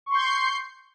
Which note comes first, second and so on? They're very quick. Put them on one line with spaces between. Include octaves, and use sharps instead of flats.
C#6 C6 G6 C7